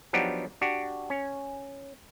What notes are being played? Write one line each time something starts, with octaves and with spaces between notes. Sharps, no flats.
F3 F#3 B3 D4 D#4 G4
D4 F#4 G4
C#4